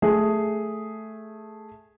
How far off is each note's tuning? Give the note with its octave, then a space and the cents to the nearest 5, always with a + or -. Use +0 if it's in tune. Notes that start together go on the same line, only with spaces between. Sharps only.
A3 -5 G#4 +0